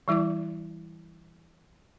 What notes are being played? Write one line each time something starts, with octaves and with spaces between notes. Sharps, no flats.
E3 G3 E4 D5 D6